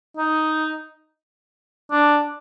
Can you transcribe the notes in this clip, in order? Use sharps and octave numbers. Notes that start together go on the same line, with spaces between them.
D#4
D4